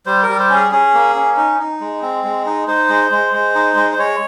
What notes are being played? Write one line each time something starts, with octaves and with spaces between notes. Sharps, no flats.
G3 C5
A#4
G3
C5
C#4
G#4
C#4 G#4
A#3
C#4
D#4
D#4
G#3
C4
G#3
D#4
D#4 C5
G#3
G#3
G#3
D#4
G#3
C5
G#3 C#5